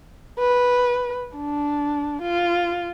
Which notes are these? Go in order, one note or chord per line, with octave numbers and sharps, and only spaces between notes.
B4
D4
F4